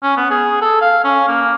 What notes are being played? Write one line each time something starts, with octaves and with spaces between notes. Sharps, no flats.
C#4
B3
G#4
A4
F5
C#4
A#3